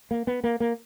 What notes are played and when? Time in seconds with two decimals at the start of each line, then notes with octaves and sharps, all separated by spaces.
0.11 A#3
0.27 B3
0.44 A#3
0.60 A#3